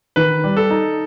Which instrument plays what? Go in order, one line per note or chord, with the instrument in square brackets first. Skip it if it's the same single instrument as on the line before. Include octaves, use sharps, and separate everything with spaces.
[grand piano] D#3 B4
G3
A4
D#4